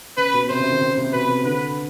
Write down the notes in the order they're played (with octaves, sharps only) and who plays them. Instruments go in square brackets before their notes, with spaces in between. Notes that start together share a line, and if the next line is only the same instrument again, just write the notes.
[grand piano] C#3 [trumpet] B4
[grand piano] B2
[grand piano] C3 [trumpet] C5
[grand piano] C#3
D#3
C#3
C3
[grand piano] B2 [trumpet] B4
[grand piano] C3
[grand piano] D3 [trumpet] B4